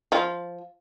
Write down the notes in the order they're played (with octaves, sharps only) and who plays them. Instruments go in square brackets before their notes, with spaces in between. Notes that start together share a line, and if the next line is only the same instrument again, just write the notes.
[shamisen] F3 F4